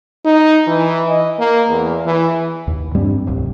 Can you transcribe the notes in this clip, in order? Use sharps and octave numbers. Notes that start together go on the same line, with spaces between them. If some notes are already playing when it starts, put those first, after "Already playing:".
D#4
E3
D#5
A#3
E2
E3
D#2
G2 G3 C4 D4
D1 C2 C3